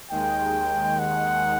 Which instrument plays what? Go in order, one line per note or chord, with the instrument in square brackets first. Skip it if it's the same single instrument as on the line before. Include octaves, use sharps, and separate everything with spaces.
[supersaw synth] D#2 D#3 G#3 [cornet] G5
[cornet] F#5